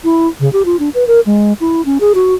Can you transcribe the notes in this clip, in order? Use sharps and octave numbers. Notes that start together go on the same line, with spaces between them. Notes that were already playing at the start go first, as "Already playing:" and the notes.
E4
C#3
G4
F4
D4
B4
A#4
G#3
E4
C#4
G#4
F#4